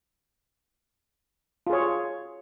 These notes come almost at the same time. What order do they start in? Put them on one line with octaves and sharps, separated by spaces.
F4 G#4 C#5